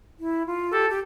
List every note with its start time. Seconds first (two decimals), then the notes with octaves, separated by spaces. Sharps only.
0.20 E4
0.46 F4
0.72 G4 A4
0.90 G4